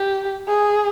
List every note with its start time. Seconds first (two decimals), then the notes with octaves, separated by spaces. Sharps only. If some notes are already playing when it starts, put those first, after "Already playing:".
Already playing: G4
0.48 G#4